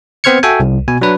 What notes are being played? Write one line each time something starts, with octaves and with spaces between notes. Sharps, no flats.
B3 C4 C5 F6 G#6 C#7
F#4 A4 E5 G5 G#5
C2
B2 G#5
F#3 D4 B4